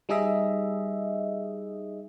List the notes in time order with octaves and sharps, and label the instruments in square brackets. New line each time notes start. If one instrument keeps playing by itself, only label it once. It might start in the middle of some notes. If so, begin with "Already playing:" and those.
[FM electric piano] G3 D#4 G#4 D#5 E5